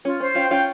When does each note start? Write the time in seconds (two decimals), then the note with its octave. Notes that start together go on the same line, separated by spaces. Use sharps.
0.04 C#4 F4
0.20 C#4 C5
0.35 C#4 F4 G5
0.51 C#4 F4 G5